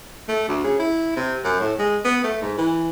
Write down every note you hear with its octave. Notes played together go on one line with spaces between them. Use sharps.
A3
D2
C#3
E4
C3
F#2
A2
G#3
B3
A3
G#2
E3